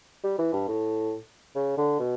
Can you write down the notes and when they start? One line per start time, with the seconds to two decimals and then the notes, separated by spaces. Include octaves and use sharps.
0.24 G3
0.39 E3
0.53 G2
0.68 A2
1.55 C#3
1.77 D3
1.99 B2